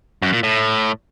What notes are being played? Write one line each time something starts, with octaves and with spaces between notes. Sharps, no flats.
F#2
A#2
A2